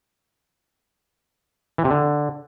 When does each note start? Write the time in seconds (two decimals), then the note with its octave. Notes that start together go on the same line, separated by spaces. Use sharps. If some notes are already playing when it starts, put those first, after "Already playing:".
1.78 E3
1.84 C3
1.91 D3